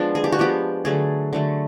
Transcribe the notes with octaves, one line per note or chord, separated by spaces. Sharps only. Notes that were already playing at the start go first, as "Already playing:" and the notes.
Already playing: F3 G#3 B3 D4
G#4
G4
F#4
F3 G#3 B3 G4
D3 F#3 A3 G#4
D3 F#3 A3